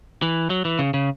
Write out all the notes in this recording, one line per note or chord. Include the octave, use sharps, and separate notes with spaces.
E3
F#3
E3
C#3
C#3